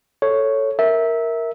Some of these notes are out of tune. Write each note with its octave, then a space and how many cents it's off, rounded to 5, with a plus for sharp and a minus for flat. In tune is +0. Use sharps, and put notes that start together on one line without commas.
A4 +0 C#5 +0
A#4 +0 E5 -15